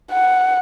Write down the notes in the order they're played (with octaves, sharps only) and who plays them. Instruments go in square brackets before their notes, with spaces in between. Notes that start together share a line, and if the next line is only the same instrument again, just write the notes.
[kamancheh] F#5